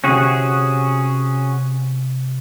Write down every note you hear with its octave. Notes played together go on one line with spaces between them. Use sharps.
C3 C#4 F#4 G#4